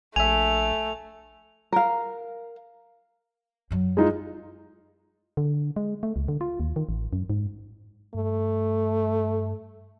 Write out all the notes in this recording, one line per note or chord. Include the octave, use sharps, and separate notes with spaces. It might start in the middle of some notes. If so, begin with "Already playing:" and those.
A#1 A3 E5 G#5 F7
A#4 F5
F#2 F#3
G#3 D#4 F4
D3
G#3
A3
C#2
D3
F4
D#2
D#3
A1
F#2
G#2
G2 A3